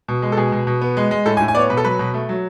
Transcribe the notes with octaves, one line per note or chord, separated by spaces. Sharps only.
B2
G#3
A4
B2 G#4
B2
B2
B3
G#3
G#3
A2 A4
G#5
A2
G#5
B3 C#5 D5
B2 B4
A4
F#3 B4
B2
A3
F#3